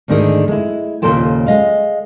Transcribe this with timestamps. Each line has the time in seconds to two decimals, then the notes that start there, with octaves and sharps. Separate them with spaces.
0.08 D2 G#2 D3 D#3 G#4
0.48 G#3 E4
1.02 D#2 A#2 C#3 A4 C5 G5
1.47 G#3 D#5 F5